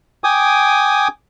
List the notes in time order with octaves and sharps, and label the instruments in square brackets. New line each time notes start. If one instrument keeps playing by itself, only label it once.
[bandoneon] G5 G#5 D6 D#6